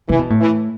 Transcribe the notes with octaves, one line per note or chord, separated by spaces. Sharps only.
C3 E3
B2
A2
E3